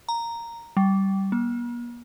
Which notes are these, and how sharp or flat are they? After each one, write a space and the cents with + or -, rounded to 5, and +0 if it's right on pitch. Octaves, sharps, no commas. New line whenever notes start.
A#5 -5
G3 -15
A#3 +45